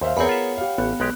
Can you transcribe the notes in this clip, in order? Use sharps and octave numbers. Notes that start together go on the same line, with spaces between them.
D#2 C5 E5 F5
E2 B3 C4 G#4 A#4 C#5 F#5 B5
F4 E5
G4 F5
A1 B3
B1 G#3 G4 F#6